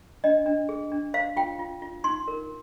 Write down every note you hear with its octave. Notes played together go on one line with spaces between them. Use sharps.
D4 D#5
D4
G#4
D4
C5 F5
F4 G5
F4
F4
D#4 C6
A#4